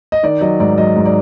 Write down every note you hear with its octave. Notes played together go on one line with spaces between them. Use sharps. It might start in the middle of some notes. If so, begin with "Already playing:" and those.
D#5
D#3 D5
F#3 D#5
G#2 D5
F#3 D#5
G#2
D5